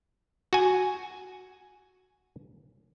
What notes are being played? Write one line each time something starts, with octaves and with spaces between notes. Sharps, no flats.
F#4 G#5